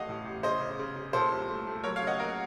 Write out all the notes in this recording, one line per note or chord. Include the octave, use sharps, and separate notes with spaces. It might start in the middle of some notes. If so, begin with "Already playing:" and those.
Already playing: A1 A3 D#5 F5 F#5
A2
A1
C#3 C5 D#5
C#3
C#3
C#3
A#2 A4 C5
C2
A3
A3
F#3 A#4 C#5
C#5 F5
C#3
D#5 F#5
A#3 F#4 A#4